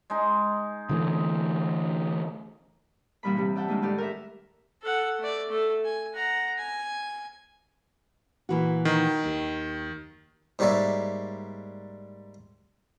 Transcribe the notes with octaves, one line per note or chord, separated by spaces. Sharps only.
G#3 D#4
D3 E3 A3
G2 A#2 E3 G3 D#4 B5
C3 G3
D5 E5 F#5 G5 A5
D#3 G3 G#3 A#3 D4 E4
A2 D#3 G4 D5 F#5
A#4 D5 E5
A4 F#5
A3 D5
A3 A4
G#5
F#5 A#5
G#5
A#2 E3 F#4
D#3
D#2
G#2 G3 A#3 C#5 D5 E5